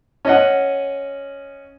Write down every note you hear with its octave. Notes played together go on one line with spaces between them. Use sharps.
C#4 D#5 F#5